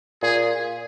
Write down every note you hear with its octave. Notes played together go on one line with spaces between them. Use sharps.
A#2 G#4